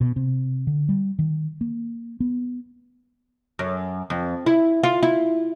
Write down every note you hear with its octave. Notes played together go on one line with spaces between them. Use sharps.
B2
C3
D3
G3
D#3
A#3
B3
F#2
F2
E4
F4
E4